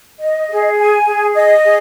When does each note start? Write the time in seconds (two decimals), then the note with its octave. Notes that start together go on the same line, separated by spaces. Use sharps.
0.21 D#5
0.50 G#4
0.78 G#5
1.07 G#4
1.35 D#5
1.64 G#4